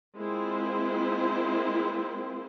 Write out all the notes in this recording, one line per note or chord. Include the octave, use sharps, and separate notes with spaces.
G#3 A#3 C4 E4 F4 C5